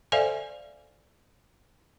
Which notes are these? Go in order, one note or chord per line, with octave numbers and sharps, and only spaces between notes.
A4 C5 D5 E5 F5 G#5